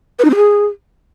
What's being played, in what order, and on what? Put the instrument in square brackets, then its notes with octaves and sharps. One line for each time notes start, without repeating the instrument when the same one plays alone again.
[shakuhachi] B4
D#4
C4
G#4